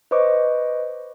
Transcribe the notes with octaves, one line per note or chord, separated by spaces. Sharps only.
B4 C5 D#5 C#6 D6